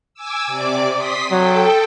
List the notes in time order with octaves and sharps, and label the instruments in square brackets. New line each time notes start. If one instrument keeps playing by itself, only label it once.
[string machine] G#5 D6 E6
C3 D5 D6
C6 D#6 B6
[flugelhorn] F#3 [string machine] A4 G5